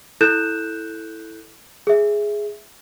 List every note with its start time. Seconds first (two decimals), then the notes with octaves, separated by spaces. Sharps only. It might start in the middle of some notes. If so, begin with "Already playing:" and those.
0.21 E4 A4 F#6 G6 E7
1.87 G#4 E5